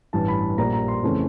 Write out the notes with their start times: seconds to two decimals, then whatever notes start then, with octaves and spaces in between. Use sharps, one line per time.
0.13 A1 G2 E3 A5
0.28 B5
0.58 A#1 A#2 G3 A#3 A#5
0.73 A#5
0.88 C6
1.03 F2 C#3 E3 A3 C#4